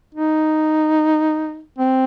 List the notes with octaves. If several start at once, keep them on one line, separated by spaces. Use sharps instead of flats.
D#4
C4